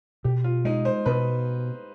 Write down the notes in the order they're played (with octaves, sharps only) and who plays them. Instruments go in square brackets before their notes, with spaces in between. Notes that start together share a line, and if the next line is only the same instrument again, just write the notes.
[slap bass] B2 [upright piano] G4
[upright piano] F4
[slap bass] G#3 [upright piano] D#4
[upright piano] C5
[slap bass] B2 [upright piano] B4